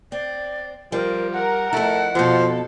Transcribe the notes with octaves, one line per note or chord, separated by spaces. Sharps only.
C4 D5
F3 G3 A#4
A#4 F#5
F2 A3 E4
F2 B2 F3 A4